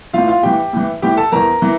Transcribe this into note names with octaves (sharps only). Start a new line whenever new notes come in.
A2 E3 F4 F5
F4 F5
A2 E3 G4 G5
A2 E3
A2 E3 G4 G5
A4 A5
E2 E3 A#4 A#5
E3